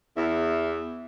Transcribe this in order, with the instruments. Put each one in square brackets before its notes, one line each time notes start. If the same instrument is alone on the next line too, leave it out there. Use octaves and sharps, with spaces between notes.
[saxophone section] E2 E5